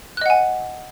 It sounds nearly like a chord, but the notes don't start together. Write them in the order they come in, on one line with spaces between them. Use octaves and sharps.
F#6 D#5 F#5 G#5